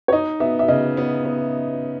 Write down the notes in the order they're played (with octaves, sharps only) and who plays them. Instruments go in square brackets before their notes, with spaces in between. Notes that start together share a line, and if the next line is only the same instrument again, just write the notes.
[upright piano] C#5
[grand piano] D#4 [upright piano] D#5
[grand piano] B3 [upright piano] E5
[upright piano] E5
[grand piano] C#3 [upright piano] D#5
[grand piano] B3
B3